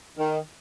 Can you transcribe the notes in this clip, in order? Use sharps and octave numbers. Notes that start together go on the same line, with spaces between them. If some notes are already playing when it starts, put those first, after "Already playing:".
D#3